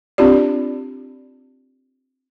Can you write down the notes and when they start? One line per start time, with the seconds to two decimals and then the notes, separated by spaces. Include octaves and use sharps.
0.18 C4 D4 F4 G4 D5